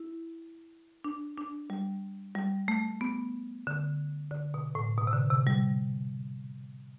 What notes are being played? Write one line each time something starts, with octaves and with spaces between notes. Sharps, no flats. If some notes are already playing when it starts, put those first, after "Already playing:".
Already playing: E4
D4
D4
G3
G3
A3
B3
D3
D3
B2
A2
B2
C3
D3
C3
G3